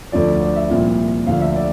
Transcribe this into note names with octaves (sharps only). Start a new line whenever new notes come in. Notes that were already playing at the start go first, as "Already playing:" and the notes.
D2 D3 F3 D5
D5
E5
C2 A#2 F3
D2 D3 F3 F5
E5
D5